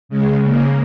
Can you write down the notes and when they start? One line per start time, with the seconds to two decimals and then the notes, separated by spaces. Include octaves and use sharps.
0.09 C#3 G#3
0.42 C#3 A#3